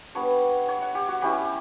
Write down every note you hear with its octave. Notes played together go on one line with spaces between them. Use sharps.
G3 B3 D4 C#5
C#5
F#5
G4
F#4
G3 C#4 E4 G4